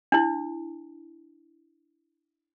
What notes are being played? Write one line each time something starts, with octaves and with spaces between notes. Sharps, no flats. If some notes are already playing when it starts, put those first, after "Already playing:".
D4 E4